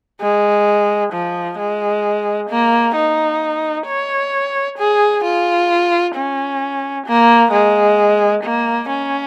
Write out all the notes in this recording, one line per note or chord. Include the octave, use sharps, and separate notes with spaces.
G#3
F3
G#3
A#3
D#4
C#5
G#4
F4
C#4
A#3
G#3
A#3
C#4